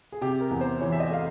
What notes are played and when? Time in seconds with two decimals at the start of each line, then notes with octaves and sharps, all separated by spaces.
0.12 G#4
0.21 C3 G4
0.41 A#4
0.50 E2
0.61 C5
0.80 E3 C#5
0.92 E5
1.00 D#5
1.10 A3 F5